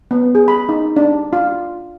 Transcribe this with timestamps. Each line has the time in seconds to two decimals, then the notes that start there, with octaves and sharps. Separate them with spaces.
0.11 B3
0.35 G#4
0.48 B5
0.69 D#4
0.96 D4
1.33 F4